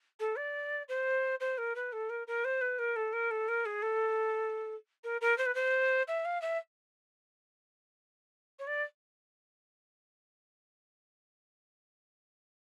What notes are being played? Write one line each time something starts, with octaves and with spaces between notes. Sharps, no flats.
A4
D5
C5
C5
A#4
B4
A4
A#4
A#4
C5
B4
A#4
A4
A#4
A4
A#4
G#4
A4
A#4
A#4
C5
B4
C5
E5
F5
E5
C#5
D5